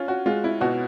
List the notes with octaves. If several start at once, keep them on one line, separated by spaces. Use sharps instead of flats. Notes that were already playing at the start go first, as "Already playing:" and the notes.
Already playing: C#4 F4
F#4
G#3 F4
E4
B2 F#4